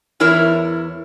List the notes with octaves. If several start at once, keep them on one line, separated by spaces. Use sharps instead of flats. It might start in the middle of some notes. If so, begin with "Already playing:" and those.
E2 E4 A#4 C#5